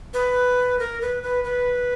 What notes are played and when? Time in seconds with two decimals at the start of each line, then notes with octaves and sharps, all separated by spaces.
0.14 B4
0.79 A#4
1.01 B4
1.23 B4
1.44 B4